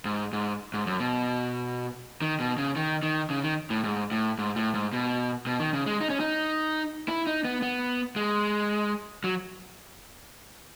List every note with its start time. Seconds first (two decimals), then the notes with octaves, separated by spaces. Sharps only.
0.05 G#2
0.33 G#2
0.74 G#2
0.87 F#2
1.00 B2
2.22 D#3
2.40 B2
2.58 C#3
2.76 D#3
3.03 D#3
3.30 C#3
3.44 D#3
3.70 A2
3.84 G#2
4.12 A2
4.39 G#2
4.56 A2
4.74 G#2
4.93 B2
5.47 B2
5.60 D#3
5.73 C#3
5.86 G#3
6.01 D#4
6.10 C#4
6.20 D#4
7.08 E4
7.27 D#4
7.45 B3
7.62 B3
8.16 G#3
9.24 F#3